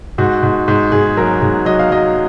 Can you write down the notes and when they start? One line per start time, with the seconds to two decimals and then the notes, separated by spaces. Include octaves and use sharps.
0.18 G#2 F#4
0.43 G#2
0.68 G#2
0.92 G#2 G#4
1.17 F#3 A#4
1.42 G#2
1.66 F#3 D#5
1.79 F5
1.91 F#3 D#5